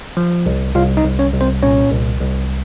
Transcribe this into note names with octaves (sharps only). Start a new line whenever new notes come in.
F3
C2
C2 F4 F5
D#4 D#5
C2
C#4 C#5
C2
C4 C5
A#2 C#4 C#5
C2
C2